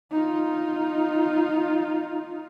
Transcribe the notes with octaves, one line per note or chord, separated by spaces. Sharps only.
D#4 F4